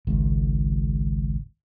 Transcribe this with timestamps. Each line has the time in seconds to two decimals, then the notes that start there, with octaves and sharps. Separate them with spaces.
0.07 G#1 C#2 G#2